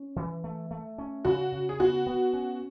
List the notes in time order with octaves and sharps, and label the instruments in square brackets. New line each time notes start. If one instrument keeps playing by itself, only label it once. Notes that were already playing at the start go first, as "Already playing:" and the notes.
Already playing: [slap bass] C#4
E3
A3
A3
C#4
[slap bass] C#3 [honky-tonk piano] F#4
[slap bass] C#3
[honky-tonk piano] G#4
[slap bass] B3 [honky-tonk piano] F#4
[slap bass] B3
C#4